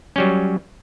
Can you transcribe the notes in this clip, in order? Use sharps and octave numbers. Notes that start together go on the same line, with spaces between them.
F#3 G3 C#4